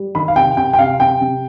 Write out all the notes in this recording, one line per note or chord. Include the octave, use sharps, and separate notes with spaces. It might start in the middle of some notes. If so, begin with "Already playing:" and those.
Already playing: G3
D#3 B5
F5
C3 G5
C3 G5
G5
C3 F5
C3 G5
C3